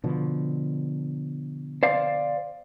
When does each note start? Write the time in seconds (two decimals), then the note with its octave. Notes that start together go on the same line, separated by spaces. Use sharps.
0.04 B2 D3 F3
1.83 C5 D5 F5